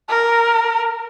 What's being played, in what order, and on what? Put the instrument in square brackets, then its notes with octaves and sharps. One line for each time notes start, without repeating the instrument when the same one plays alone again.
[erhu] A#4